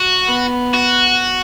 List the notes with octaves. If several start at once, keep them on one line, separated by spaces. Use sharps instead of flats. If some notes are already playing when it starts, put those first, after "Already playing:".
Already playing: F#4
B3
F#4